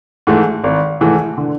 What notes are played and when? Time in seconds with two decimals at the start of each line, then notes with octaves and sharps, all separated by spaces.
0.27 G#2 E3 A3
0.64 G#1
1.01 G#2 E3 A3
1.38 D3